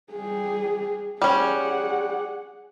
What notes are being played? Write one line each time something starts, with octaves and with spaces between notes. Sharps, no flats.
G3 G#4
G3 C#4 G#4 F#5